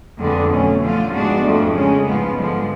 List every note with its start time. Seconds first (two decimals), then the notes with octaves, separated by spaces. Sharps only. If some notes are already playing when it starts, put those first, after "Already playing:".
0.19 F2 D3 G#3 B3 D4
0.50 B2 F#3 A3 C#4
0.81 D3 F3 A3 F4
1.11 G#2 G#3 B3 D4 F#4
1.43 F2 F3 A3
1.74 C#3 G#3 C#4
2.06 G#2 F3 G#3 B3
2.37 D3 F3 G#3